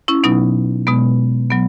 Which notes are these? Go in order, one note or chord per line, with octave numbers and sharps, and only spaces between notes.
C#4 E4
B2 F#3 B3 D#4
B2 G#3 B3
F#3 B3